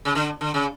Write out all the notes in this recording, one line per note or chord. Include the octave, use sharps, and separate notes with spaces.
C#3
D3
D3
C#3